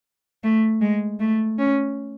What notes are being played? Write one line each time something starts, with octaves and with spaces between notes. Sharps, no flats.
A3
G#3
A3
C#4